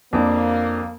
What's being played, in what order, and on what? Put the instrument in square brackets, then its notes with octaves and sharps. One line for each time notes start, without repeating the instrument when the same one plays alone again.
[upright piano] F2 D4 [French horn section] A#3